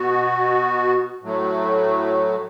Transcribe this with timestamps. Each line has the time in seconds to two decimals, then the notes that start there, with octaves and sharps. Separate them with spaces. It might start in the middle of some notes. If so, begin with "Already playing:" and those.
Already playing: B2 B3 F#4
1.22 A2 F#3 A3